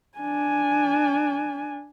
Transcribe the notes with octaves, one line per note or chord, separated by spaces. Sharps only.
D4 G#5